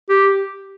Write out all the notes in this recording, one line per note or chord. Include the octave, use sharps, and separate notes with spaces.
G4